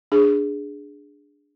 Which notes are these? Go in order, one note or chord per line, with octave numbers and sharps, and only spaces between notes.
D4 G#4